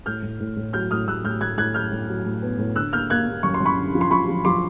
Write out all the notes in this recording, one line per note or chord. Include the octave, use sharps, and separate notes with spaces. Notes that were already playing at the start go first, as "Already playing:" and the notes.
A2 F6 G6
A2
A2
A2
F#3 F6 G6
A2 D#6 F6
A2 E6 F#6
A2 F6 G6
A2 F#6 G#6
A2 F#6 G#6
F#3 F6 G6
A2
F#3
A2
B3
A2
D3 E6 F#6
A#3 F6 G6
A#3 F#6 G#6
A#3
F#2 C#6
C6
F#2
B5 C#6
D3
F3
C6
F3 B5 C#6
F3
F3 C6 D6